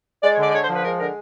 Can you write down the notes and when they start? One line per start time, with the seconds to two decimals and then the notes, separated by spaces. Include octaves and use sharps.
0.23 G#3 D5
0.34 C#5
0.38 D3 D5
0.50 D5
0.53 D3 C#5
0.64 C5
0.69 F3
0.74 B4
0.84 G#3 A#4
1.00 D3 A#4